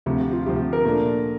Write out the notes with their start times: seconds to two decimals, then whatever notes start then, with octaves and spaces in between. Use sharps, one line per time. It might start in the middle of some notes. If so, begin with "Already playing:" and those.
0.06 D2 C3 F3 G4
0.20 G4
0.33 F4
0.46 D2 C3 F3 G4
0.73 A#4
0.85 A#2 A3 D4